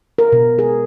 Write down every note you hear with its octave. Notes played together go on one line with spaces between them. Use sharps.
A#4
B2
G#4